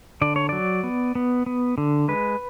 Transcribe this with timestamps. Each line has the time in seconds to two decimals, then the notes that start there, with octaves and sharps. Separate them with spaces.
0.21 D3 D5
0.36 C#5
0.49 F#3 D5
0.84 B3
1.15 B3
1.46 B3
1.78 D3
2.08 G#3 B4